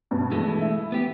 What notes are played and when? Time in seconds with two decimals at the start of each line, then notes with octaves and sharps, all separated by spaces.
0.11 G2 B2
0.31 E3 G#3 A3
0.61 E4
0.92 B3 G4